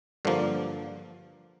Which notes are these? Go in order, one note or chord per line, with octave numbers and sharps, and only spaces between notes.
G2 D3 F3 A#3